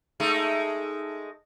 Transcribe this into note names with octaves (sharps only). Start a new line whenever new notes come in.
G#3 A3 D#4